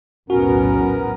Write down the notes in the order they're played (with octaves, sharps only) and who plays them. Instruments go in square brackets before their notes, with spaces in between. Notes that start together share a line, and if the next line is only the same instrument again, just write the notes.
[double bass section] B1 E2 A2 [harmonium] B3 A#4 [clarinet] C#4 [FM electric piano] F#4